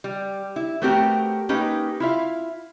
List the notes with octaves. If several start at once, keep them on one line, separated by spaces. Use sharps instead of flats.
G3
E4
A3 B3 C4 F#4 G4 A#4
A#3 C#4 D#4 G4 B4
E4 F4 E5 F5